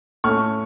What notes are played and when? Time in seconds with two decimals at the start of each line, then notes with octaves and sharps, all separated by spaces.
0.24 A2 A3 C#4 C#6 F6